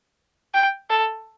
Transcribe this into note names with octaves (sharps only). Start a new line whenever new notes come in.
G5
A4